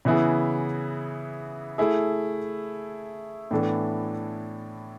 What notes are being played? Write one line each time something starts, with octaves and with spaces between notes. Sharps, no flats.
C#3 E3 B3 E4 G#4
A3 E4 G#4
A2 E3 B3 D4 A4